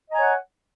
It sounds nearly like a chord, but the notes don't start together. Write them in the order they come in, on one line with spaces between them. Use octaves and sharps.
D#5 A#5 G#5 C#5 F#5